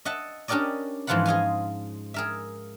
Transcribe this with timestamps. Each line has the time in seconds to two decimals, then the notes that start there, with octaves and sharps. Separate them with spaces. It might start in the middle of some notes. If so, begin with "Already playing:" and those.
0.05 D#5 E5 F#5 A5
0.48 C#4 D4 G4 A#4 D5 D#5
1.07 G#2 E3 F3 F4 F#5 B5
1.26 G#4 D#5 F5 G#5
2.14 G#4 A#4 E5